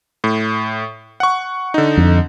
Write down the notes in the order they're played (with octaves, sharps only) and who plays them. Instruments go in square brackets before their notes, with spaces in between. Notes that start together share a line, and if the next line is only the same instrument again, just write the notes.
[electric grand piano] A2
F#5 C#6
D3 D#4
[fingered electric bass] F2